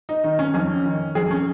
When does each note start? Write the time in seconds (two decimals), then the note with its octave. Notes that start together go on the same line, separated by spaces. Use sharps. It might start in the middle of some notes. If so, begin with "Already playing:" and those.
0.09 D#4
0.24 D#3 D#4
0.39 C#4
0.54 F2 C#4
0.85 D#3
1.15 F2 G#4
1.31 C#4